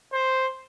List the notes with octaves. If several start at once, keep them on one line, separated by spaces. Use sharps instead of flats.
C5